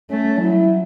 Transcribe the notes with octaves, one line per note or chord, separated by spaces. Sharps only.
A3 C#4
F#3 E4